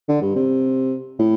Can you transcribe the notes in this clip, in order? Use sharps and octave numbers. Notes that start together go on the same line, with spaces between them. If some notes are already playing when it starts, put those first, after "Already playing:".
D3
G2
C3
A2